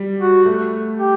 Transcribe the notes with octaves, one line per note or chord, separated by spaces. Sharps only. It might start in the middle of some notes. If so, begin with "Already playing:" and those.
Already playing: G3
F#4
A3
G4